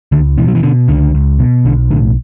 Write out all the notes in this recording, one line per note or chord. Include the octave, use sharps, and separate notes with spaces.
C#2 D3
B2 E3
F#3
E3
B2 D3
C#2 D3
C#2
B2
B1 D3
A2 D3